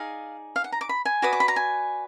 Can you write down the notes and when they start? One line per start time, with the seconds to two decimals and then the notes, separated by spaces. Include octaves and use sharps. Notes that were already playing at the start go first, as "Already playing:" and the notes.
Already playing: D#4 G#4 D5 F5
0.56 F5
0.64 F#5
0.72 A#5
0.81 D6
0.89 B5
1.05 G#5
1.22 F#4 B4 D5 D#6
1.33 D6
1.40 B5
1.48 A#5
1.56 G#5